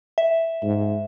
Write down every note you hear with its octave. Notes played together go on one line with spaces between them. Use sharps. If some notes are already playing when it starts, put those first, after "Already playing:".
E5
G#2